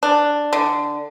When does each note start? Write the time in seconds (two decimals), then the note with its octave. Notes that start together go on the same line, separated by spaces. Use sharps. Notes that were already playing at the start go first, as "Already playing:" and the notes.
0.03 D4
0.53 D3